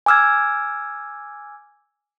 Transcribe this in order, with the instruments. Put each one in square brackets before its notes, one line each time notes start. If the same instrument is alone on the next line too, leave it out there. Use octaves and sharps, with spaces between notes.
[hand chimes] G#5 D6 E6 F6 G#6